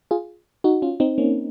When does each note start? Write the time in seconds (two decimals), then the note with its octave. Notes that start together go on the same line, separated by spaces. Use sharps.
0.11 F4 G#4
0.64 D#4 F#4
0.82 C#4 F4
1.00 C4 D#4
1.18 A#3 C#4